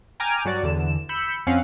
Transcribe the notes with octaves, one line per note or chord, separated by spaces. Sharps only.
G5 G#5 A#5 D6 F6
G2 F#3 F#4 D5
E2 D3 E7
B5 E6 G6 C#7
F2 C4 C#4 F5 F#5